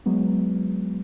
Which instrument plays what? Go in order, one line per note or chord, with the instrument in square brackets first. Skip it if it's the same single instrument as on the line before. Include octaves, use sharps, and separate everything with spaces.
[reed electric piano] F#3 G#3 B3